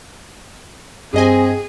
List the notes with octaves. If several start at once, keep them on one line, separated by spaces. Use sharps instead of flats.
G2 C4 G#4 D#5 G#5